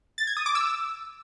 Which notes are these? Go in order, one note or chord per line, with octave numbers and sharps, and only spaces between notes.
A6
G#6
D#6
D6
E6